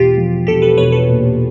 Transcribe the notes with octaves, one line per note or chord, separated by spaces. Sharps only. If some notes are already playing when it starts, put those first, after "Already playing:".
Already playing: E1 F4 G4
F3
E1 G4 A4
A4 B4
E1 B4 C#5
A4 B4
A#2